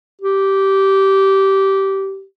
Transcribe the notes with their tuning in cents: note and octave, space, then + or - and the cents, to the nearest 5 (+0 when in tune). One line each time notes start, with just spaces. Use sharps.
G4 -15